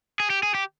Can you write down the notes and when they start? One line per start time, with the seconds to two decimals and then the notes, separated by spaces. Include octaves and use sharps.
0.20 G#4
0.30 G4
0.43 G#4
0.55 G4